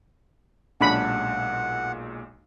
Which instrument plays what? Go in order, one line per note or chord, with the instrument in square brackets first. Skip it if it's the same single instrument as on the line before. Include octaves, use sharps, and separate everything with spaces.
[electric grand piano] B1 A#2 G#3 [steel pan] C#4 D4 B5 [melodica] F#5